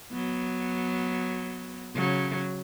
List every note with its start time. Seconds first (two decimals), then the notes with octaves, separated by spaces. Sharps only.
0.13 F#3 B3
1.95 C#3 F#3